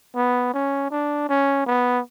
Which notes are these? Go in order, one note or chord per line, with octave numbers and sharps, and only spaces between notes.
B3
C#4
D4
C#4
B3